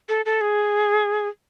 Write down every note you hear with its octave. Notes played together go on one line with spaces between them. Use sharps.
A4
A4
G#4